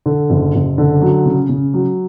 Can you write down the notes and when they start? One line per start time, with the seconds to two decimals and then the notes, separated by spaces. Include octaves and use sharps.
0.06 D3
0.30 F#1
0.54 F#1
0.78 D3
1.02 F#3
1.26 C#3
1.49 C#3
1.74 F#3